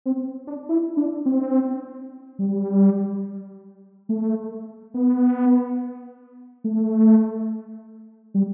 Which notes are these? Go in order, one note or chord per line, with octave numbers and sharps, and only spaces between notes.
C4
D4
E4
D4
C4
G3
A3
B3
A3
G3